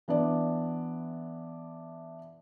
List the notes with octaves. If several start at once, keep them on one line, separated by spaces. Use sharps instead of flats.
E3 B3 D4 D5